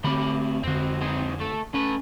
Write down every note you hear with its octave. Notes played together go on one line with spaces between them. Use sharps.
D3 A3 C4 G4 B5
F2 D3 C4 F#4
C4 D#4 G#4
A3 A4
A3 C#4 B4